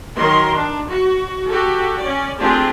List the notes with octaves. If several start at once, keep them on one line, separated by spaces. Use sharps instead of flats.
D#3 F#3 A#4 C6
D4
F#4
F#4 G4 A4
C#4 D5
A3 C4 D4 F4 G4 G#4